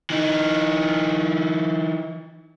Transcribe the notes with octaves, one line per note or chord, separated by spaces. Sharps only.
E3 D#4